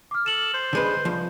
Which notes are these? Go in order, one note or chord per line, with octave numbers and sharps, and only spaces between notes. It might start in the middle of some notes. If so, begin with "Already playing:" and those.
D6 F6
A4 E7 F#7
C5
D3 G#3 B4
C2 F3